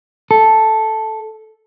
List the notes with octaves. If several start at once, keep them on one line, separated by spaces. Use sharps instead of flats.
A4